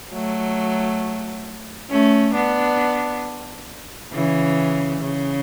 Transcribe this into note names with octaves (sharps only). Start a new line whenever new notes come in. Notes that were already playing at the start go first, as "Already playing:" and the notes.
F#3 A3
A3 C#4
B3 D4
C#3 E3
C#3